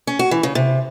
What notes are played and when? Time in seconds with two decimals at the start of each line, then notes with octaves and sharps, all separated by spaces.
0.07 C#4
0.19 F#4
0.31 E3
0.43 C#3
0.55 C3